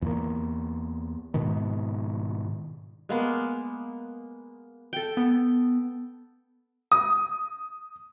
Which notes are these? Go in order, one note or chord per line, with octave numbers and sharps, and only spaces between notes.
E2 A#3
G#2 B2 D#3
G#3 A#3 B3
A4 G5
B3
D#6